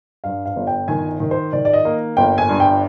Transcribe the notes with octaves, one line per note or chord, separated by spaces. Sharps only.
G2 F5
F5
G1
G5
D#3 G#5
D#3
C5
D#3 D5
D5
D#5
A#3
G1 G5
G#5
G2
G5